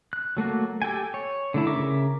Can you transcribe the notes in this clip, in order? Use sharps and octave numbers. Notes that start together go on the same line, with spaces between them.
F#6
F#3 A3 A#3 F#4
G4 A4 G5 G#5
C#5
D3 A3 E4
C#3 A#4 E5 D6